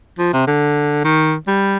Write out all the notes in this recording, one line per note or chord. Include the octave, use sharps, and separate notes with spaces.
F3
C3
D3
D#3
G3